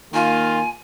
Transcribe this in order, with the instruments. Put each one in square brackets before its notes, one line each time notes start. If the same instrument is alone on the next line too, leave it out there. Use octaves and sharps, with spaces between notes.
[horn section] D#3 A#3 F4 [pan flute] G#5